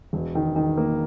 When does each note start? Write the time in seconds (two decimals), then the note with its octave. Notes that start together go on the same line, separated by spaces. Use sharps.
0.13 E1
0.35 D#3
0.56 D#3
0.77 A#3